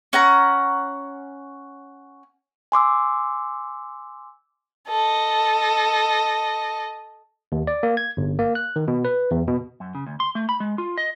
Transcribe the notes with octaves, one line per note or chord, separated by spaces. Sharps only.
C#4 F#5 A#5
G#5 C6 D6 E6
A4 D#5
D#2
D5
A#3
G#6
G1
A#3
F#6
D#3
B2
B4
E2
B2
F#2
C#3
D2
C6
A3
B5
G#3
F4
D#5